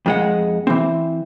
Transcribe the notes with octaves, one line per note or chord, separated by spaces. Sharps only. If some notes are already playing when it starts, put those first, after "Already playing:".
F2 G#3 F#5
E3 C4